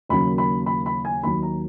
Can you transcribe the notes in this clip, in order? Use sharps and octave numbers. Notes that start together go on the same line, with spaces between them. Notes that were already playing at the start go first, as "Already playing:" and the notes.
D#2 C#3 F#3 A#3 B5
B5
B5
B5
G#5
D#2 D#3 F#3 B5
A#5